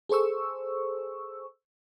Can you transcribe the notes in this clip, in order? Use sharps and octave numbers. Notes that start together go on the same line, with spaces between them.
G#4 A4 C5 C#6 E6